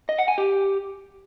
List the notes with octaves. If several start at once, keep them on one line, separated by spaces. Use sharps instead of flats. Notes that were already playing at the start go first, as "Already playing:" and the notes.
D#5
F#5
G#5
G4